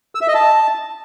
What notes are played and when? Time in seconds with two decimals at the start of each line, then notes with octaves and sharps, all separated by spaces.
0.15 E6
0.22 E5
0.28 D#5
0.35 A5